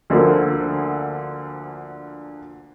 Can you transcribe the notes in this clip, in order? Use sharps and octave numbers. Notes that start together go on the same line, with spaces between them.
D2 D3 F3 A#3